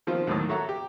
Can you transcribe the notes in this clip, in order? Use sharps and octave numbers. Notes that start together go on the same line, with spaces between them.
D#3 F3 C4 F4
D#2 A2 D#3 F#3 A5 D#6
F#4 A4 C#5 E5 F#5 A#5
G4